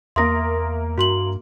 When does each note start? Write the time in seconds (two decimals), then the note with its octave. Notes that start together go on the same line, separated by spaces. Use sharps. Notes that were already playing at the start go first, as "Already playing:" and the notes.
0.16 E2 A#3 A#4 E5 C6 D#6 A#6
0.98 G2 F#4 C6 F#7